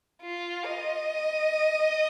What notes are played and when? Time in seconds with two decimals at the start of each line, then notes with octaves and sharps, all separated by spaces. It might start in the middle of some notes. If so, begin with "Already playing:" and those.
0.22 F4
0.65 D#5